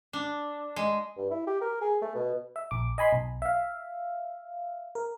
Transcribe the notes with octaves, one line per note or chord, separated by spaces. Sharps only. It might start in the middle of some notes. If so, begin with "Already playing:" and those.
D4
G#3
G2
E4
G4
A#4
G#4
A3
B2
E5
A#1 D6
D#5 G#5 B5 C6
B1
E5 F5
A#4